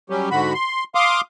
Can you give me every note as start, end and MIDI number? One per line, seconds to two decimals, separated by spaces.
0.10 0.29 54
0.10 0.29 55
0.10 0.29 61
0.10 0.29 67
0.31 0.53 44
0.31 0.53 50
0.31 0.53 66
0.31 0.53 83
0.54 0.84 84
0.95 1.21 77
0.95 1.21 84
0.95 1.21 86
0.95 1.21 87